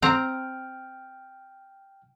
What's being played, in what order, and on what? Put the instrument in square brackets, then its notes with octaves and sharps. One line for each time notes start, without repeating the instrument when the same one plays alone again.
[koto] C4 A#5 [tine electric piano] G5 F6